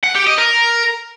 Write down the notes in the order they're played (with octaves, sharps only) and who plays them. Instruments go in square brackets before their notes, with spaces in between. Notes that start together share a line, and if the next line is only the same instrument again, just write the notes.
[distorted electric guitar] F#5
G4
D#5
A#4